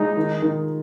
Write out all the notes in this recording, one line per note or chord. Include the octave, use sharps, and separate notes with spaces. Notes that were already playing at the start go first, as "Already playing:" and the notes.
Already playing: G#3 D#4
D#3
D#3